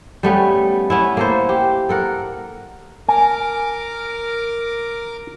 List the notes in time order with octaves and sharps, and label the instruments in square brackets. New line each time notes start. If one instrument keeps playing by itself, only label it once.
[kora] G3 A3 B3 C#4
B3 C#4 E4
A#3 A4 C5
G4
A4 A#4 F#5
[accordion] A#4 D6 [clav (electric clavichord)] G#5